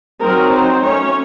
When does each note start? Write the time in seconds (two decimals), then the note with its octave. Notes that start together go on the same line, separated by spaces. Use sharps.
0.21 F#3 C4 D#4 A#4
0.53 C5
0.83 A3 C#4 C#5